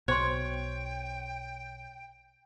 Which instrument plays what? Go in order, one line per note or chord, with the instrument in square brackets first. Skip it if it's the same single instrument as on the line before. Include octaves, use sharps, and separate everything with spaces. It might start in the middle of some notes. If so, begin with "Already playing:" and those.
[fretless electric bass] B1 B2 [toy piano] C5 C6 [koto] C#5 [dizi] G5